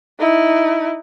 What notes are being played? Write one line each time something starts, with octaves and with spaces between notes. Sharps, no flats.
D#4 E4